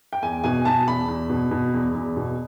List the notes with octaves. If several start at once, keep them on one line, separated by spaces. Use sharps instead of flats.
G5
E2 G#5
B2 G#5
B2 A5
E2 B5
E2
B2
B2
E2
E2
B2